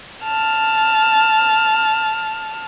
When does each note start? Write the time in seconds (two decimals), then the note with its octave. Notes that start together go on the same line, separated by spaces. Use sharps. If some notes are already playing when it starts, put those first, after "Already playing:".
0.24 A5 F6